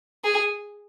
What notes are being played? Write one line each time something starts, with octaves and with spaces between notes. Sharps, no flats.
G#4